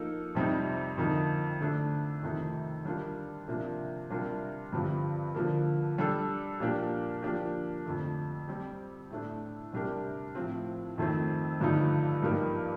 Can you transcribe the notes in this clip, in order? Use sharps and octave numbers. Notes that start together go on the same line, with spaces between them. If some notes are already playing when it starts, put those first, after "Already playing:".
Already playing: F3 A#3 D#4 A4
F2 C3 G3 C4 D#4
F2 D3 F3 A#3 D#4
D3 A3 D4
F2 C3 D#3 A3 D#4
G3 D4 F4 A#4
C3 F3 A#3 D4
C3 G3 D4 F4 A#4
G2 D3 F3 C4 G4
D3 F3 A#3
G3 D4 A4
A#2 F3 A#3 D4 G4
F3 A#3 D4 G4
F2 D3 A3
G3 C4 G4
A2 A3 D4
C3 G3 D4 G4 A#4
A2 F3 C4
F2 D#3 A3 C4
G2 D3 F3 A3 D#4
G2 F3 A#3 D#4 G4